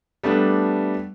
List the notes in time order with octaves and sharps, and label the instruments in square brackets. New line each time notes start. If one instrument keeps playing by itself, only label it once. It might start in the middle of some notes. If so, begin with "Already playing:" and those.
[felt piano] G3 A3 B3 D4